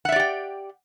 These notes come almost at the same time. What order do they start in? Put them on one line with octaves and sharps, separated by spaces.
F#5 E5 D5 G4 G5